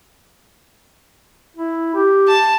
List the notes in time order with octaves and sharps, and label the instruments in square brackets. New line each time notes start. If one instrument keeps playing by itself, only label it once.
[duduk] E4
G4
[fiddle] A5